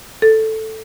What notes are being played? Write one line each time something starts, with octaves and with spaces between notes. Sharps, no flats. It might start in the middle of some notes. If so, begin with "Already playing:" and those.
A4